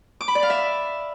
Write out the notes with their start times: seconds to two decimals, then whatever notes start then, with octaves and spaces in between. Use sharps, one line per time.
0.21 D6
0.28 B5
0.35 D5
0.43 F5
0.50 E5